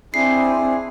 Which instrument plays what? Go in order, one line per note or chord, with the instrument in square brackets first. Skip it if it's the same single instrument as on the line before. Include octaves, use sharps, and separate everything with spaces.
[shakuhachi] C4 [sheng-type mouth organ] D4 E4 G#4 [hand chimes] C7